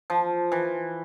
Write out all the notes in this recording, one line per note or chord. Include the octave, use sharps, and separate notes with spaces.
F3
E3